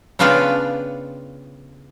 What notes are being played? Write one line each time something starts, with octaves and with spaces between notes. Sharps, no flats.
C#3 B3 D4 F4 B4 G5